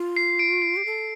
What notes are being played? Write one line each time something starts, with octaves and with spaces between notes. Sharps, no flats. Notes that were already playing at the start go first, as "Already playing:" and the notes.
Already playing: F4
C7
D7
C7
G4
A4